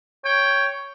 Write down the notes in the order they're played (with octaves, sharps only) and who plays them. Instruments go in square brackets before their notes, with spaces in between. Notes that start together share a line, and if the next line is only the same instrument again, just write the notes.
[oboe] C#5 [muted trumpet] G5